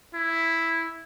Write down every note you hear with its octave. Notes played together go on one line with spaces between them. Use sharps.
E4